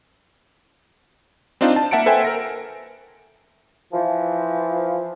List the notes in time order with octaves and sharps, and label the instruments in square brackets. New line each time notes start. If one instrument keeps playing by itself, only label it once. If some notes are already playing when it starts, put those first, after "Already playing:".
[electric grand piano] C4 D4 D#4 F4
A5
A#3 E5 F#5 A5 C#7 D7
A4 B4 C5 E5 G5 G#5
A#4 A#6 D7
[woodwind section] E3 F3